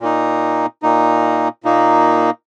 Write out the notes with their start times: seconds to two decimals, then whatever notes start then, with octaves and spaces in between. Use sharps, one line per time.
0.01 A#2 A#3 D#4
0.83 A#2 A#3 D#4
1.64 A#2 A#3 D#4